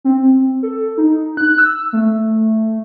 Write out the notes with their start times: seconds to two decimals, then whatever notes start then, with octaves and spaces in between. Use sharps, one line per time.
0.04 C4
0.63 A4
0.98 D#4
1.37 F#6
1.58 E6
1.93 A3